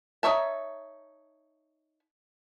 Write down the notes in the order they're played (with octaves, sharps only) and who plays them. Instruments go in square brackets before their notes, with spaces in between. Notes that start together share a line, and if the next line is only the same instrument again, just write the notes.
[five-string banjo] D#4 A#4 C#5 E5 A5